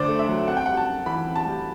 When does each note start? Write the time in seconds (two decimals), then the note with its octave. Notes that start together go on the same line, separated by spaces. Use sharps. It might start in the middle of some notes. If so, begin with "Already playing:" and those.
Already playing: D2 D3 C5 D5
0.08 A3
0.19 E5
0.29 F#3
0.48 C4 F#5
0.57 G5
0.66 G3 F#5
0.77 A5
0.87 F#2
1.06 E3 B5
1.27 C4
1.36 A5
1.46 G3